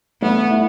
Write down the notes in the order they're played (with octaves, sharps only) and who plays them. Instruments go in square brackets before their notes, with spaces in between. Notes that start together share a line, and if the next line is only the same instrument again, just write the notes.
[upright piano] A3 [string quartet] B3
[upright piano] E4